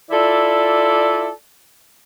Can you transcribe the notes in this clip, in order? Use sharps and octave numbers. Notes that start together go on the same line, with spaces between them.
E4 F4 A4 D5